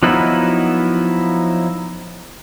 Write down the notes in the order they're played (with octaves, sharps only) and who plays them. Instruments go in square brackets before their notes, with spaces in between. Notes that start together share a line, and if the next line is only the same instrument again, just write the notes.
[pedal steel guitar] F3 F#3 B3 D#4 E4